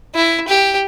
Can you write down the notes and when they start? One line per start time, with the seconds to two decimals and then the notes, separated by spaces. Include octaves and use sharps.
0.15 E4
0.48 G4